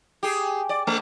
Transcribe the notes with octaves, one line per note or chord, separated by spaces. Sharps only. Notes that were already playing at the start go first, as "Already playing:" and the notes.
G4 G#4
D5
A3